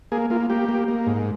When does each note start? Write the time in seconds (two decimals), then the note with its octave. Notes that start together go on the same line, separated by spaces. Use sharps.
0.12 A#3 G#4
0.30 A#3 F4
0.50 A#3 G4
0.69 A#3
0.88 A#3
1.07 G#2